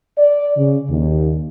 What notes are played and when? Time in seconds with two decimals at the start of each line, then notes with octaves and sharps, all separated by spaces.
0.18 D5
0.57 C#3
0.90 D#2